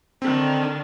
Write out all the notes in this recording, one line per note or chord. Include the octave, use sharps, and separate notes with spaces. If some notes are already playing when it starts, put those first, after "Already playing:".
D3 D#3 C4 D4